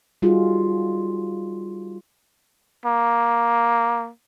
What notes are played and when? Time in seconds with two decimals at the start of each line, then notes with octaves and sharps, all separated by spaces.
0.22 G3 D#4 F4 F#4 G#4
2.86 A#3